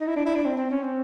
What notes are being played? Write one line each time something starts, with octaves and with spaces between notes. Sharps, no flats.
D#4
E4
D4
E4
D4
C4
C4
C#4
C4